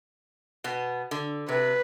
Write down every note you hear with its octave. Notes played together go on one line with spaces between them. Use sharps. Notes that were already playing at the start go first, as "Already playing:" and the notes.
B2 B3
D3
C3 B4